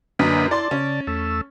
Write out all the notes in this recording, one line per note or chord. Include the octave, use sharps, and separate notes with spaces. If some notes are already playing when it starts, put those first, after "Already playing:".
F#2 D3 A#3 D4 B4 D#5 B5
E4 D5 A5 C6
C#3 C#4 D5
E2 A3 E6